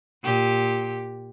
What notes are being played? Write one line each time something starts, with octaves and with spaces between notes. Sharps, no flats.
A#2 G4